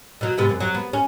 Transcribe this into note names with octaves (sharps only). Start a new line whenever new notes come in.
B2 F#3
G#2 C3 B3
F#2
F#3
B3
C#4